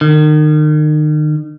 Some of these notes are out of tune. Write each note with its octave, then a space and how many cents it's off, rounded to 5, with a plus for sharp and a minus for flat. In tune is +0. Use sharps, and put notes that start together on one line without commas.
D#3 -35